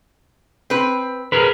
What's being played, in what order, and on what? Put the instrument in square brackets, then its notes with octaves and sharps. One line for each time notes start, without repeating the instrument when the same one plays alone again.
[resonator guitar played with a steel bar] C4 B4
[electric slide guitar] G#4 A#4 B4